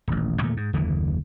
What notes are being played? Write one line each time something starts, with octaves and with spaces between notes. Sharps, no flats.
D#1 A1
E2 A#2 D#3 A3
G#2
F#1 D#2 D3 E3